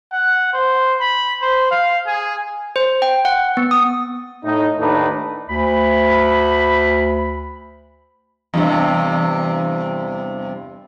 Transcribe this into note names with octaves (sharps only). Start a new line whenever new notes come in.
F#5
C5
B5
C5
F5
G#4
C5
G5
F#5
B3
D#6
A2 D#4
D#2 A2 D4 D#4 B4
D2 B5
E2 G2 C3